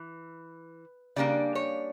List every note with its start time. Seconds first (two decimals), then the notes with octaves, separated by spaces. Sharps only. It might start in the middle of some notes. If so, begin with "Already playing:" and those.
Already playing: E3
1.16 C#3 G3 A#3 D4 D5
1.55 C#5